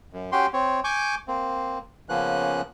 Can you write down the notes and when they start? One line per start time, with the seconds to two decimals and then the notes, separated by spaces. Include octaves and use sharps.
0.13 F#2
0.32 C#4 F#4 G4 G5 C6
0.53 C4 C#5
0.84 G#5 C#6 D6 G6
1.28 A#3 C4
2.09 C#3 F3 A#3 B3 C#4 F#6